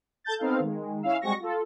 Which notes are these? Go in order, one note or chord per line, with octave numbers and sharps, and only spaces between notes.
A4 A5 G6 A6
B3 C4 D#4 A4 F5
D#3 G#3
C#4 E4 F5 E6
G3 G#3 C4 F#4 C#6 A#6
F4 A4